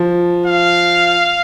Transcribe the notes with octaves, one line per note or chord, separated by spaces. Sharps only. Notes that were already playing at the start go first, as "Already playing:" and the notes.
Already playing: F3
F5